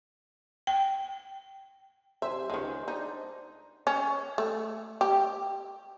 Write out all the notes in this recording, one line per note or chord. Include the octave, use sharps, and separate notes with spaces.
G5
C3 C5 E5 G#5
C#2 D#3 G#3
D4 D#4
C#4
A3
G4